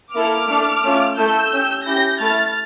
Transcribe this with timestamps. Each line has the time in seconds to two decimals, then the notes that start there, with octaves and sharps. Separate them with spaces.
0.14 A#3 E4 A4 D6 F6
0.48 A3 D4 A4
0.84 A3 C#4 F4
1.17 A3 E4 A4 E6 G6
1.53 C#4 G4
1.86 C#4 E4 G4 G6 A#6
2.20 A3 E4 A4 F6 A6